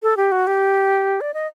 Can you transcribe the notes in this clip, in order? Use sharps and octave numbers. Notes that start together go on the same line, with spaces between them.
A4
G4
F#4
G4
D5
D#5